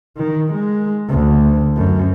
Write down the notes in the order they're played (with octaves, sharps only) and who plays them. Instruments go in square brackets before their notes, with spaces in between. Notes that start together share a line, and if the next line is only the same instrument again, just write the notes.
[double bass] D#3
G#3
D2
F#2